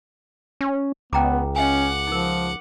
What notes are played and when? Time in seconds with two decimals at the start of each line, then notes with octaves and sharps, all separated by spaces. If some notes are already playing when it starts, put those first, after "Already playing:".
0.61 C#4
1.13 C#2 B3 G5 A#5 D6
1.56 C#4 D#5 F5 F#5 G#5 D6
2.07 F3 D#4 A#4